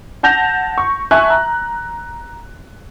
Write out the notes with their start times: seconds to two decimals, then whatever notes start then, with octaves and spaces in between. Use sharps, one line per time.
0.23 F#5 A5 G6 A#6 F7
0.78 C#6
1.11 E5 G#5 A5 C#6 F#6
1.30 A#5